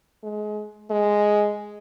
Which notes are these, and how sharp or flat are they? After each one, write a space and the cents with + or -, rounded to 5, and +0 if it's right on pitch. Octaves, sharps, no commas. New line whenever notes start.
G#3 +25
G#3 +0